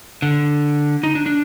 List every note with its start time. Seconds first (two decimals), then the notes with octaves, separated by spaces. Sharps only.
0.22 D3
1.03 D#4
1.15 D4
1.26 D4